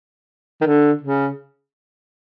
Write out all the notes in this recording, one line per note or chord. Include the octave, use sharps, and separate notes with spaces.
D#3
D3
C#3